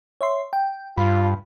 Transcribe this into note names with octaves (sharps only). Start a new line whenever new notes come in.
C#5 E5 C6
G5
G2 F4 B5